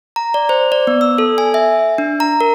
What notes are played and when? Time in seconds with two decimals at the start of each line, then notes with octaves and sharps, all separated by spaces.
0.16 A#5
0.34 D5
0.49 C5
0.72 D5
0.87 B3
1.01 E6
1.18 A4
1.38 G#5
1.54 E5
1.98 D4
2.20 A#5
2.41 A#4